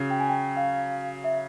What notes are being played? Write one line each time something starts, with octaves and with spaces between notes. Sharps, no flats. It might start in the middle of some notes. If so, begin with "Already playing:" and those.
Already playing: C#3 F#3
G5
G#5
G5
F5
E5